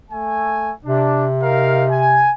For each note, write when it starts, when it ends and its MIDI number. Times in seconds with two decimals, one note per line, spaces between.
0.11 0.70 57
0.11 0.70 80
0.85 2.33 48
0.85 1.26 62
1.43 1.84 63
1.43 1.84 70
1.43 1.84 77
1.90 2.32 80